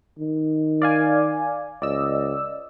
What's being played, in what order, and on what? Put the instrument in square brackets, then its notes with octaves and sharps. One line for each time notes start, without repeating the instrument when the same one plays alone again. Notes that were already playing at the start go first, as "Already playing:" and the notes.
[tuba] D#3
[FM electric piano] D5 F5 G#5
[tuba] C#2 [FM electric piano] D5 D#5 E6